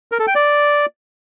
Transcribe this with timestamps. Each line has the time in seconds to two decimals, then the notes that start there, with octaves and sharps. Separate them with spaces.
0.12 A#4
0.19 A4
0.27 G5
0.35 D5